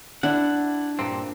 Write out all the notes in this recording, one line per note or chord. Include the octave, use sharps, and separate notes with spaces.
D4 E4 F#5
G2 A#2 C4